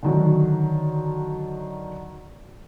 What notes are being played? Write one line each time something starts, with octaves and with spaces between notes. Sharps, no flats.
D3 D#3 F#3